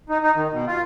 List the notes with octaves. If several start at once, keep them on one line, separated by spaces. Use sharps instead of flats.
D#4
D#4
D#3
B2
F4